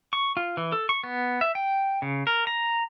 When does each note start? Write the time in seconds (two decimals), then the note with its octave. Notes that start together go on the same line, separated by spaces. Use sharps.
0.13 C#6
0.37 F4
0.57 E3
0.72 A4
0.89 C#6
1.04 B3
1.41 E5
1.55 G5
2.02 C#3
2.27 A#4
2.47 A#5